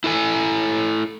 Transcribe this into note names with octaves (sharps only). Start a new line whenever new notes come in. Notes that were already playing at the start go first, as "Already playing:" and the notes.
E4 A4 G#5